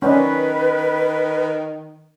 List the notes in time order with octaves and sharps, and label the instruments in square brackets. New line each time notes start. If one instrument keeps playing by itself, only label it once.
[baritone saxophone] D#3 [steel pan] C#4 D5 D#5 [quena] B4